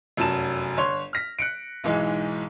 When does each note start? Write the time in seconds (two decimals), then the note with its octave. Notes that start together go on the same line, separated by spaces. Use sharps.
0.17 F1 F#2 F#3 A5 E7
0.77 G1 C#5 C6
1.13 F6 A#6 B6
1.39 F#6 C#7 D7
1.84 B1 G#2 E3 G#3